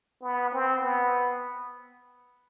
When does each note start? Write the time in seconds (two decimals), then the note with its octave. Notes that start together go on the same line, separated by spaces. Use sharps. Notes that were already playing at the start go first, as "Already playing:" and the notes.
0.22 B3
0.52 C4
0.82 B3